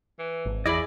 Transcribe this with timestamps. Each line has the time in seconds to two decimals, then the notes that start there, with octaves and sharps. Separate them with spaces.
0.19 E3
0.46 G#1
0.66 E2 E4 G#4 D5 D#5 B5